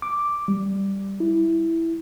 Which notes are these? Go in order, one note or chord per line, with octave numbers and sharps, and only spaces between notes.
D6
G3
E4